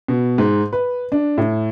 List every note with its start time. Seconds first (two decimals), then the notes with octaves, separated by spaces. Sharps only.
0.08 B2
0.38 G#2
0.73 B4
1.12 D4
1.38 A2